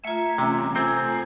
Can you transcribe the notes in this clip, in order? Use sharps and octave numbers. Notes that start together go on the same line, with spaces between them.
A3 F4 E5 A#5 G#6
E2 C3 C#4
C4 A4 G#5